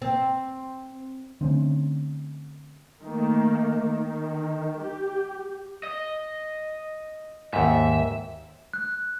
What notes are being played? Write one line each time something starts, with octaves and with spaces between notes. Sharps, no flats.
C4
D3 A3 C4 C#4
D#3 A3 A#3
D#3
G4
D#5
D#2 G#2 E5
F#6